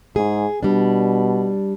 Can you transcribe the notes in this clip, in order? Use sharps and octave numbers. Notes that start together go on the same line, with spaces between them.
G#2 G#4
B2 G3 D4